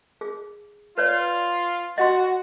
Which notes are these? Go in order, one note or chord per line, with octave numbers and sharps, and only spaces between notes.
G#4
F4 B4 C#5 D5
F#4 D#5 C6